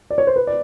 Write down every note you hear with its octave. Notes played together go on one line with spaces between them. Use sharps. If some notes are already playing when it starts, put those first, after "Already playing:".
D5
C#5
C5
B4
D5